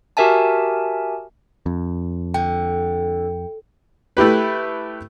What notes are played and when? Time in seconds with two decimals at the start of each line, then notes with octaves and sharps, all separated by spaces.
0.17 F#4 G4 A#4 E5 G#5 A5
1.66 F2
2.34 D3 G5
4.17 A3 E4 G4 B4